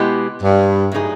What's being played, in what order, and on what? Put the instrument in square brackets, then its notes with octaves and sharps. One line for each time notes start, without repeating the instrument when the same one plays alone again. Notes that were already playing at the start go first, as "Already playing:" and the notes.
Already playing: [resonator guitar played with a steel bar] B2 G#3 B3 E4 G4
[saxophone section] G2
[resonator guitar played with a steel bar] A2 F#3 A#3 D#4 G#4